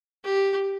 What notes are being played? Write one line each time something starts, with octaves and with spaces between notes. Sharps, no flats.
G4